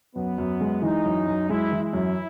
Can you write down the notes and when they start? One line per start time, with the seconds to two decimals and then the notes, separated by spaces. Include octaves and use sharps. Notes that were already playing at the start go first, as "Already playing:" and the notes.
0.16 F#2 B3
0.38 F#2
0.61 G#3
0.82 E3 D#4
1.05 F#2
1.28 F#2
1.49 G#3 E4
1.71 E3
1.82 E4
1.93 F#2